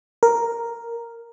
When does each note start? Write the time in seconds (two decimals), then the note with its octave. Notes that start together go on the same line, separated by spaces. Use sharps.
0.23 A#4